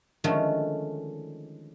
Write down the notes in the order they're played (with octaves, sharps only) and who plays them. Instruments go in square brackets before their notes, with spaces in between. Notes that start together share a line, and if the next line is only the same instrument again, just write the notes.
[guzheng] D3 D#3 F3 G#3 A3 C#4